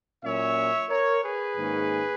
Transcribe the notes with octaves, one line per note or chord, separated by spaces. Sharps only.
A#2 F#3 C#4 C#5 E5
A#4 C#5
G#4 B4
G#2 D#3 A#3 C#4